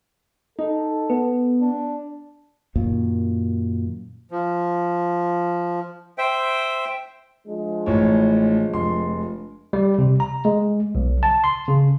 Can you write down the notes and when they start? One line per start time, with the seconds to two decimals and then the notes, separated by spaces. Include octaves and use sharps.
0.59 D#4 A4
1.10 B3
1.61 D4
2.76 F#2 A#2 D#3
4.31 F3
6.18 C5 E5 G5
7.46 F3 G#3 D4
7.86 A1 A2 C#5
8.73 F1 C6
9.73 G3
9.99 C3
10.20 A#5
10.45 G#3
10.95 B1
11.23 A5
11.44 C6
11.68 C#3